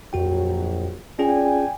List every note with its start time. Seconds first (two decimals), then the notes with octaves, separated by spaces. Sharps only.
0.13 A#1 F2 F#3 F#4 G5
1.19 C#4 F4 G#4 D5 G5 G#5